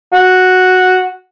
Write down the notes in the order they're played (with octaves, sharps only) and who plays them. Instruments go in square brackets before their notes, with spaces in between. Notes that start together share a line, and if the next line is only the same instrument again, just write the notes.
[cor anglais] F#4